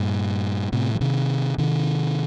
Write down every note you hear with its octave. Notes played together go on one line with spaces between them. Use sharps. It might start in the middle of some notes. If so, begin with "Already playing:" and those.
Already playing: G2 A#2
A2 C3
F3
C3 D#3
C3 D#3